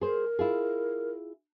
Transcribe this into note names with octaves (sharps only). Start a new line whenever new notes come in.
G#4 A#4 C5
E4 F4 G#4